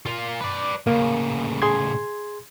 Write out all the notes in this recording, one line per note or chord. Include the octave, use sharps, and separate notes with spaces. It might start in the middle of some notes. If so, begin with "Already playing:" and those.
A#3 F4
B4 D5
A2 C#3 A#3
G#4 C6 G#6